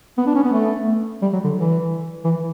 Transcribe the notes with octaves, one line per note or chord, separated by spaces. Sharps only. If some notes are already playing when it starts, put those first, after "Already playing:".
B3
D4
C#4
B3
A3
G3
F#3
D3
E3
E3